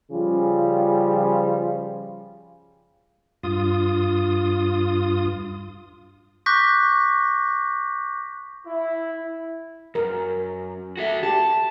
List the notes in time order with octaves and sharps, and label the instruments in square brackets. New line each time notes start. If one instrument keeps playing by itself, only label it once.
[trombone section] C#3 F3 G3 F4
[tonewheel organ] G2 F4 D#6
[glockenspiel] C#6 D6 F#6 G6 A#6 B6
[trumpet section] E4
[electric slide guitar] F#2 [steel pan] A#4
[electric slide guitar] F#4 A4 E5
[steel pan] G4 [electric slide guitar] A5